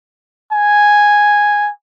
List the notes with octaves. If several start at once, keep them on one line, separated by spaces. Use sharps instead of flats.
G#5